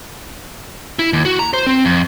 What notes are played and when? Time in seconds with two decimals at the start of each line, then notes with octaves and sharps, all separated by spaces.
0.99 E4
1.13 D#2
1.25 F#4
1.39 A#5
1.54 C5
1.67 C4
1.85 F2